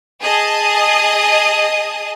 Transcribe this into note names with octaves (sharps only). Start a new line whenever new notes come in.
G#4 D#5 A5 D#6